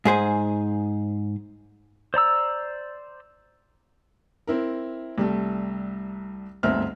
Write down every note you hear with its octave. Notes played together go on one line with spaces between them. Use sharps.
G#2 G#4 C5 G#5
C5 D5 A#5 E6
C4 E4 A#4
C2 G3 A3
G1 D2 G#2 C4 E5 F6